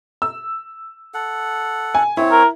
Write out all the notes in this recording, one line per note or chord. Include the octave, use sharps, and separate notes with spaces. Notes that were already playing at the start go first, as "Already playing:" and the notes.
E6
A4 F#5
G#5
C4 E4 C#5
A#4